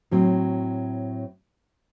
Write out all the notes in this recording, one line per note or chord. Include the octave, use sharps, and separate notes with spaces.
A2 F#3 C4